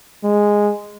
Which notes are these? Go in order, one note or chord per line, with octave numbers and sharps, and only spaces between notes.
G#3